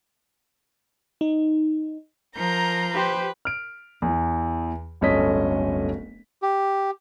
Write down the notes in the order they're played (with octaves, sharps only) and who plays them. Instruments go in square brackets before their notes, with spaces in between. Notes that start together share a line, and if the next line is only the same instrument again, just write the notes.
[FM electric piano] D#4
[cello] F3 [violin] A#4 G6 [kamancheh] A#5
[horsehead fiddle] G4 C5 [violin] B4
[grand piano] F6 D7
E2 E3
D1 G1 C#4 A4 D#5 B6
[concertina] G4